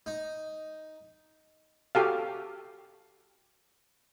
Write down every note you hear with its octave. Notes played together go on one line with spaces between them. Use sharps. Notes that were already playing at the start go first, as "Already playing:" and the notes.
D#4
F#4 G4 A4 F5